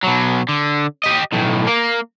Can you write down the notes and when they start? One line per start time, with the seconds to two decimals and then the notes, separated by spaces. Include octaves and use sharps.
0.03 B2 F#3
0.49 D3
1.03 G4 D#5
1.33 B1 A2
1.67 A#3 A#4